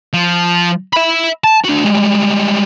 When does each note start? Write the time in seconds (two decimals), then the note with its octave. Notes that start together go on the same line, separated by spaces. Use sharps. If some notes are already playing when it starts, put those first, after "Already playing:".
0.14 F3
0.93 E5 B5
1.44 A5
1.64 D4 F#4
1.84 G3 G#3